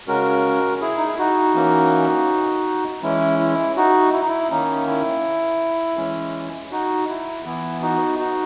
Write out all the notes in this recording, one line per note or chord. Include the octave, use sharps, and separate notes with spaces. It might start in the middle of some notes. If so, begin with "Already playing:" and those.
C#3 G#3 C#4 F#4 A#4
E4 G#4
D#4
E4
D#4 F#4
E3 A#3 C#4
E3 G#3 C#4 E4
E4
D#4 F#4
E4
D#4
E4
D#3 A#3 C#4 D#4
E4
E3 G#3 C#4
D#4 F#4
E4
E3 B3 E4
D#4 F#4
D#4 F#4